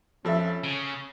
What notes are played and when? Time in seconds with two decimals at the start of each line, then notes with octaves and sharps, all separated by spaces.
0.25 F2 F3 C#4 A4 E5 E6
0.64 C#3 D7